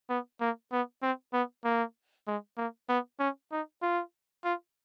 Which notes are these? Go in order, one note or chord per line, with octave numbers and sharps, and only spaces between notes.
B3
A#3
B3
C4
B3
A#3
G#3
A#3
B3
C#4
D#4
F4
F4